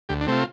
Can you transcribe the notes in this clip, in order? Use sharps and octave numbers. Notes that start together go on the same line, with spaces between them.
D2 G4
D4
C3 A3 C4 F4